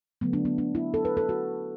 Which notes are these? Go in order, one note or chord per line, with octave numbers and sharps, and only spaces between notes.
D3 F#3 A3 B3
D4
B3
D4
E4
A4
B4
A4
F#4